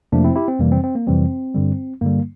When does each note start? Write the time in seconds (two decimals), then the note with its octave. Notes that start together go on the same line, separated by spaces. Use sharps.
0.12 F2 C3 F3 A3 A#3 D4
0.24 C4 E4
0.36 E4 G4
0.48 C4
0.60 F2 C3 E3 G3 A#3
0.72 C4
0.84 C4
0.95 A#3
1.07 F2 C3 E3 G3 C4
1.55 G2 D3 G3
2.01 G2 D3 G3 A#3